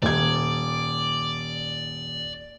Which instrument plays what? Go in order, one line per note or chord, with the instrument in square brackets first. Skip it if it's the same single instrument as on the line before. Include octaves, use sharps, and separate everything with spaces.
[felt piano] D#1 G#6 [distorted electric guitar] D5